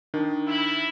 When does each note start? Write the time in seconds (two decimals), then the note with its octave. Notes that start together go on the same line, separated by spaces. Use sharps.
0.14 D#3 D4
0.46 E4